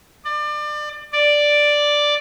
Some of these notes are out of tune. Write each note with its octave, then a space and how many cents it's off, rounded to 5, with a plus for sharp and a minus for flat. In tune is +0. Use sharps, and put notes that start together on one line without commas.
D5 +30
D5 +0